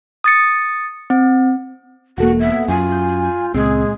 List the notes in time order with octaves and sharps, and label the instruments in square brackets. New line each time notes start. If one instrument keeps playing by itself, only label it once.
[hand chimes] D#6 A6 C#7
C4
[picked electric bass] E1 [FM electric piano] A#3 A4 F#5 [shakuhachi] F#4
[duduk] B3 [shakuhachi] E5
[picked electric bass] F#2 [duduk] F4 [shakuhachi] G#5
[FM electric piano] G6
[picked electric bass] C#2 C4 [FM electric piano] A#2 [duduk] G#3 [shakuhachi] G#4